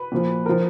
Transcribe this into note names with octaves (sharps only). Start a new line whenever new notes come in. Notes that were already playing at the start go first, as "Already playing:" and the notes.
Already playing: B4
A#2 F3
F3 A#4